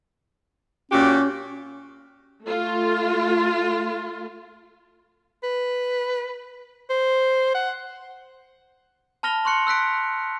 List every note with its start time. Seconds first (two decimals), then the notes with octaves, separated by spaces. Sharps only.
0.91 A#2 C#4 F#4 G4
2.45 A3 F4
5.43 B4
6.90 C5
7.55 F#5
9.23 A5 B5 F6 A#6 F7 G7
9.45 C6 C#6 F#6 C#7
9.67 E6 F#6 B6 D7